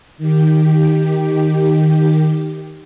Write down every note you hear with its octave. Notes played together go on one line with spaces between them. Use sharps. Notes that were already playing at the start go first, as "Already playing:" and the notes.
D#3 G4